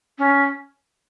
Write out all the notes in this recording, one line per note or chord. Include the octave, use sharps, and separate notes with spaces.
C#4